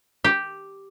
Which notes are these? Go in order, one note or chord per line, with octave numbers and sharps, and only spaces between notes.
G4